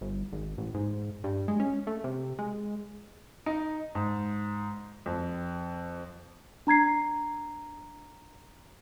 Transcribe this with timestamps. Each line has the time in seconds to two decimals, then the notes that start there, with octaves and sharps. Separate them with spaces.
0.01 G1
0.32 G#1
0.58 A1
0.74 G#2
1.24 G2
1.48 G#3
1.60 C#4
1.87 A3
2.04 C3
2.39 G#3
3.46 D#4
3.95 G#2
5.06 F2
6.67 D4 A#5 G#6 C7